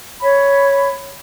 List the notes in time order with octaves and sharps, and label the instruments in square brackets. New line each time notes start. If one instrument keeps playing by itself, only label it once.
[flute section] C#5 B5